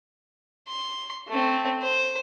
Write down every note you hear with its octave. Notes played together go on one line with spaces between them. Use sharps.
C6
A3 C4
C5